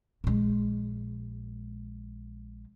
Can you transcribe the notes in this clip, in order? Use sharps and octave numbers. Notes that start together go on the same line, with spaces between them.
A#1 G#3